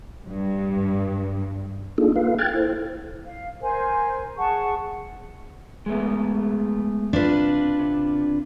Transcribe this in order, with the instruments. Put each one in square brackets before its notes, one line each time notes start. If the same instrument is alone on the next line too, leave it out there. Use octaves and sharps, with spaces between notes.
[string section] G2
[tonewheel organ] A#3 D4 D#4 F4 G#4 A4
A#3 F4 A4 B4 F5
G5 F6 F#6 G#6 A6
E4 A4 C5
[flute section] F5
A#4 C5 G#5
G#4 F#5 A5 C#6
[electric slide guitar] G#3 A3 B3
[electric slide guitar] C3 [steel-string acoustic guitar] D4 F4 B4
[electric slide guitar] C3